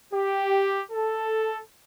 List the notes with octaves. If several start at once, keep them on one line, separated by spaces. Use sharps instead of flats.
G4
A4